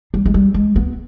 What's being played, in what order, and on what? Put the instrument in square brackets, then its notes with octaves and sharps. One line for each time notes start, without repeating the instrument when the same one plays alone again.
[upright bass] G3
G#3
G3
G#3
B3